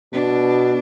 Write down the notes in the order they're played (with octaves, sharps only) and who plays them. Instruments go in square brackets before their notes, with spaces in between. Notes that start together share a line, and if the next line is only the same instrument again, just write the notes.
[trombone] B2 [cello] D4